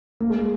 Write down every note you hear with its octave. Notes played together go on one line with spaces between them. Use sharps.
A#3
G#3